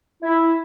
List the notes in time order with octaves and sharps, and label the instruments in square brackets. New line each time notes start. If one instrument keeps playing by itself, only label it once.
[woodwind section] E4